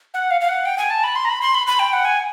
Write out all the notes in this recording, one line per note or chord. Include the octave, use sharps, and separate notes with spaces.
F#5
F5
F5
F#5
G5
G#5
A5
B5
C6
A#5
B5
C6
B5
B5
G5
F#5
G#5